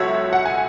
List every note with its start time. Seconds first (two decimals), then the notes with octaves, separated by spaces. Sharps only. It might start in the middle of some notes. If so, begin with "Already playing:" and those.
Already playing: C#2 B2 F#3 F#4 A4 C#5 E5
0.33 F#5
0.45 G#5